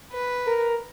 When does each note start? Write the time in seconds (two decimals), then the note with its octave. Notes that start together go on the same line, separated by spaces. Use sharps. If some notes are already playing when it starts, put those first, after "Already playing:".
0.12 B4
0.47 A#4